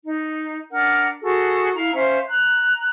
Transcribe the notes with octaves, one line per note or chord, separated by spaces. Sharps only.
D#4
D4 A#4 F#5
F#4 G#4 A4
E4 F5 A#5
C#4 C5 E5 F5
A#5 F#6